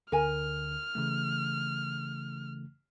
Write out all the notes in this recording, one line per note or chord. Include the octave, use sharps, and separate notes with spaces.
D2 D3 A#4 G#5 F6
C#3 E3 A3